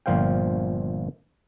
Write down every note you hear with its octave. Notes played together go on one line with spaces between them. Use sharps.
G1 A#2 F3 C5 F5 G5